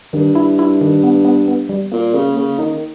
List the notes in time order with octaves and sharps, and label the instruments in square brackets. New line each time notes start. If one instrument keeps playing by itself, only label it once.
[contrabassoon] G2 [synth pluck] D#3
[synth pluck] E4
E4
D#3
B3
B3
B3
G3
[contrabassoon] A#2 [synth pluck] A#3
[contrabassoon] C#3 [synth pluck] A#3
[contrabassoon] C#3 [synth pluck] A#3
[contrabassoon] D#3 [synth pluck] D#4